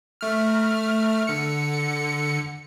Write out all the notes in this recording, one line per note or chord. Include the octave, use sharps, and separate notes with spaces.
A3 F6
D3 C#7